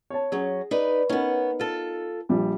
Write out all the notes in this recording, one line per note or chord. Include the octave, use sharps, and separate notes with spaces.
C#5 A5
F#3 C#4 G#4
D#4 B4 D5
B3 C#4 D#4 A#4
F4 A4
A#1 F3 G3